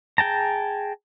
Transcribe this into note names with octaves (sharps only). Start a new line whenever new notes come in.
G#4 G5 A5 A#5